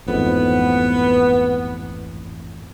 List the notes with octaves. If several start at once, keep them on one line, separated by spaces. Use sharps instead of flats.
A1 F2 G#2 B3